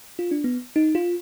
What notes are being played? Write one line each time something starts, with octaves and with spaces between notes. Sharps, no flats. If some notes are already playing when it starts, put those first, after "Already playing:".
F4
D4
B3
D#4
F4